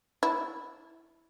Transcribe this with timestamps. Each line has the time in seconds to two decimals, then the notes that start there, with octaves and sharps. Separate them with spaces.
0.23 E4